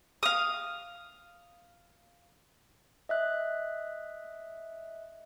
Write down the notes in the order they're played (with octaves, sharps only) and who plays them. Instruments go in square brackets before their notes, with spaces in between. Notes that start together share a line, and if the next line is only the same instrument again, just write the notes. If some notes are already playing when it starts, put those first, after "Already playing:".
[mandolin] F5 D#6
[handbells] D#5 E5 F#6